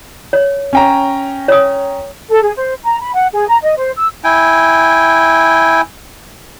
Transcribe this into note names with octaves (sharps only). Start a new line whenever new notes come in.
C#5
C#4 G5 A#5
C#5 D#6
A4
G#4
C5
A#5
B5
F#5
G#4
A#5
D#5
C5
E6
E4 G5 G#5